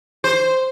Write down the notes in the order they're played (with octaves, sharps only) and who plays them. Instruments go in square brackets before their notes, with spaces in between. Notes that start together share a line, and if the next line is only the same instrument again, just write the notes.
[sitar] C5